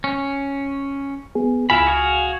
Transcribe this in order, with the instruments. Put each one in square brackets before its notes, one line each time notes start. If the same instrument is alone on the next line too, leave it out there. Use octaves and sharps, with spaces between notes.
[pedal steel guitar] C#4
[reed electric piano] B3 G#4
[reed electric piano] C#2 G#5 [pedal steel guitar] E4 F4 B5
[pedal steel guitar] F#4 G#4 F5